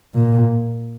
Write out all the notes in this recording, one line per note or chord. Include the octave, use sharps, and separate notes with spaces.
A#2